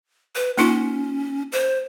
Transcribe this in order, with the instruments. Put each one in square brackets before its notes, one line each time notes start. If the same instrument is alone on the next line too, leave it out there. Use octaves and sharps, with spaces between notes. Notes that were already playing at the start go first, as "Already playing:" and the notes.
[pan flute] B4
[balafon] A#3 D#4 F4 [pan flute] C#4
[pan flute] C5